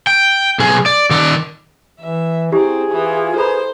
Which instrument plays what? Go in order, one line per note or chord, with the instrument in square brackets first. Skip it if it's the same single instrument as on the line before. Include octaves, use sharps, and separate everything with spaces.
[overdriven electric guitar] G5
B1 G#4
D5
D#3 D5
[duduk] E3 [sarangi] E5
[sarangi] C4 [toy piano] E4 G4 [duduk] G#4
[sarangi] E3 [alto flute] F4
[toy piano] A4 A#5 B5 [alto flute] B4 [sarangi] C5